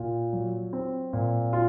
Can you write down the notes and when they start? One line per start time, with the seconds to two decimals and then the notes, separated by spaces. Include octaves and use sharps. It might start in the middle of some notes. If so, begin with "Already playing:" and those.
Already playing: A#2 F4
0.33 F#3
0.73 C4
1.13 A#2
1.53 F4